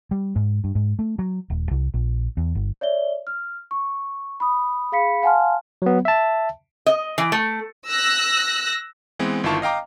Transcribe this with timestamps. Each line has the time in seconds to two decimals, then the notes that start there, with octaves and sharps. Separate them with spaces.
0.11 G3
0.36 G#2
0.64 G2
0.75 G#2
0.99 A3
1.19 F#3
1.50 D#1
1.71 C2
1.94 A#1
2.37 E2
2.55 G1
2.81 C#5 D5 E5 G7
3.27 F6
3.71 C#6
4.40 B5 D#6
4.92 G#4 F5 B5 B6 C#7
5.23 F5 F#5 G#5 A5 C6 F6
5.82 F#3 B3
6.05 E5 A5
6.86 D#5
7.18 E3
7.32 A3
7.87 E6 F#6 A#6
9.19 E3 G#3 B3 C4
9.44 G1 D#3 E4 F4 A5 C#6
9.62 D#5 F5 G5 A#5 D6